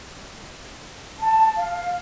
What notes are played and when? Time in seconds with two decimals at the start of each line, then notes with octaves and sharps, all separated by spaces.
1.19 A5
1.56 F5